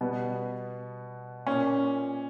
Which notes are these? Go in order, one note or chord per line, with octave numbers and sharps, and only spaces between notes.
B2 G3 B3
A#2 A#3 C#4